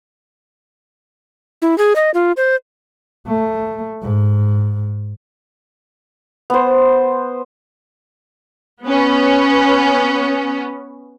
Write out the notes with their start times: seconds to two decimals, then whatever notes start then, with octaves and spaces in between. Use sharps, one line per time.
1.62 E4
1.78 G#4
1.96 D#5
2.14 F4
2.37 C5
3.27 A3
4.02 G#2
6.50 B3 C5
8.83 B3 C#4